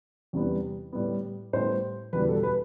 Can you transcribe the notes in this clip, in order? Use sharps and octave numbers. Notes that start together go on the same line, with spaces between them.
E2 C3 G3 B3
A2 G3 B3
A2 G3 B3 C5
E2 B2 G3 B4
A4
B4